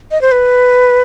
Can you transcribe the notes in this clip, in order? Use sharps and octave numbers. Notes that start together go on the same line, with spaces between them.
D#5
C5
B4